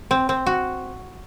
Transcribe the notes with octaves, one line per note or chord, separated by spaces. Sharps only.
C4
C4
F#4